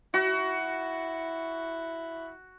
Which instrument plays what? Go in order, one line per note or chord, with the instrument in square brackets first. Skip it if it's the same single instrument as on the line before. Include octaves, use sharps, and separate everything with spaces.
[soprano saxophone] E4 [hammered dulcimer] F#4